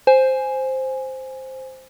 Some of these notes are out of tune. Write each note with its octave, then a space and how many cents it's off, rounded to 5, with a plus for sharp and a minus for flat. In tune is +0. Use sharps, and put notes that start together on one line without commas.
C5 +0 G#5 +0